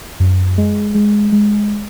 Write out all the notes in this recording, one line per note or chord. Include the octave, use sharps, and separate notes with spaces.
F#2
G#3
G#3
G#3